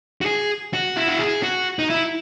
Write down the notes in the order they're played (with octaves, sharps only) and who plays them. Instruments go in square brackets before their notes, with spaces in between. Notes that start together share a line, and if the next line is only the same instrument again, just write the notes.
[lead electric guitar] F#4
G#4
F#4
E4
F#4
G#4
F#4
D#4
E4